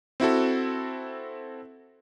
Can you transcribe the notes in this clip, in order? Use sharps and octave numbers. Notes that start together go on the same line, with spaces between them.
C4 E4 F#4 A4